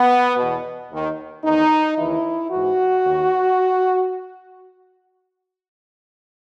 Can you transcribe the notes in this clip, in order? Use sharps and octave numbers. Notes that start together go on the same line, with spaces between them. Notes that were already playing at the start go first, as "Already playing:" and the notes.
Already playing: B3
E2 B2
D#2 D#3
E2 D#3 D#4
D#2 C#3 E3 E4
G#2 E3 F#4
D#2 D#3